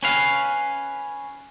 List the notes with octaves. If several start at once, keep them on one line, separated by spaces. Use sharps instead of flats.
C#4 B4 F5